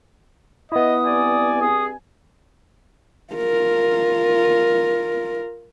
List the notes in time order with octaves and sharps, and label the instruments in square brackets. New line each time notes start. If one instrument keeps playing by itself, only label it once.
[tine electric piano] B3 E4 [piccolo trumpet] D#5 [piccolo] D#6
[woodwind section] G2 C4 G#5 [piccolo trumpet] D5
[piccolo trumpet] G#4 [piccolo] D#6
[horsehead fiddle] F4 A#4